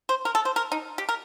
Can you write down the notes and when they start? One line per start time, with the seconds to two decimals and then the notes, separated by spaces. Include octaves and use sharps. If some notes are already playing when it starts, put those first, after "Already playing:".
0.09 C5
0.25 A#4
0.35 A4
0.45 C5
0.56 A#4
0.72 D#4
0.98 G4
1.09 A#4